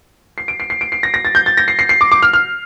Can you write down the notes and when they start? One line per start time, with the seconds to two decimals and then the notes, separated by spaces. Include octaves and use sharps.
0.38 C7
0.48 D7
0.60 C7
0.70 C7
0.81 D7
0.92 C7
1.03 A#6
1.14 A#6
1.25 A6
1.35 G6
1.46 A6
1.57 A#6
1.68 C7
1.79 C7
1.89 C7
2.01 D6
2.12 D6
2.22 F6
2.33 F6